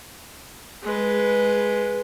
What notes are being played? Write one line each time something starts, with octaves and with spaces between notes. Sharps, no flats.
G#3 B4